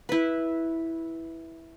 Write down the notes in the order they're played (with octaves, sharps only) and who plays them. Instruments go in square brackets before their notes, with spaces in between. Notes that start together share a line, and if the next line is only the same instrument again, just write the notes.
[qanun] E4 B4